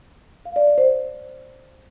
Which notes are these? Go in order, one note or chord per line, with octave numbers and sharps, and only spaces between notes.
F5
D5
D5
C5